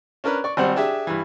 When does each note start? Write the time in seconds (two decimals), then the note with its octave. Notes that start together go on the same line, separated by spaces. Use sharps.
0.24 C#4 D4 A#4 B4
0.44 D5 C#6
0.57 G#1 G3 C4 C5 F#5
0.76 D4 G4 G#4 E5
1.07 G2 E3